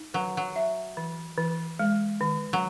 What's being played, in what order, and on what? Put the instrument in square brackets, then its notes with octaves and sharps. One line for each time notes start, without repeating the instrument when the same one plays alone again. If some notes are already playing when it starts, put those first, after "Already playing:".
Already playing: [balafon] D#4
[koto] F#3 [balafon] B4
[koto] F#3
[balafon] E5
E3
E3
G#3
D#3
[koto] F#3